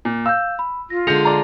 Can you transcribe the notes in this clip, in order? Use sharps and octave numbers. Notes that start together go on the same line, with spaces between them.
A#2
F5 E6 G6
B5
F4 A#6
D3 G#3 G#4 G6 A#6 C#7 F7
D5 A5 A#5